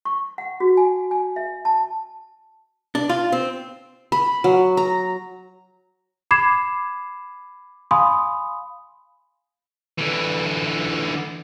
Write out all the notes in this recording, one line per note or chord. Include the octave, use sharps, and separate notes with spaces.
C#6
F#5
F#4
G#5
G#5
E5
A5
D4
F4
C4
B5
F#3
A#5
B5 D6 G#6 C7 E7
F5 G#5 B5 C6 D#6
D3 E3